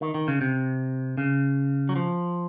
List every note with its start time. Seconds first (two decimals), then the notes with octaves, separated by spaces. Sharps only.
0.02 D#3
0.14 D#3
0.28 C#3
0.41 C3
1.18 C#3
1.89 F#3
1.96 F3